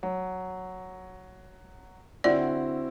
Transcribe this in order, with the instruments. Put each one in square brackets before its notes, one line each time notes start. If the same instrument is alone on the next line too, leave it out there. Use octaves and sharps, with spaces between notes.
[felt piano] F#3
[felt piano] D3 [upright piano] C4 E4 F#4 [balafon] D5